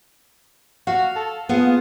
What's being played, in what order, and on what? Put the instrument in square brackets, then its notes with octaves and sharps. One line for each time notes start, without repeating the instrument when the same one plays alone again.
[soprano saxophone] F#4 [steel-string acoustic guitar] F5
[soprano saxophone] A4
[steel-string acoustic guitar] B3 G#4 F#5 [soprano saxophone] F4